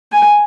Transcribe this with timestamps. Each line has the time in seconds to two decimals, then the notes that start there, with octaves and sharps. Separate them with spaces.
0.12 G#5